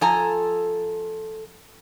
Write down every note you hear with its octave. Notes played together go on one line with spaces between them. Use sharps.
F3 A4 G#5 A#5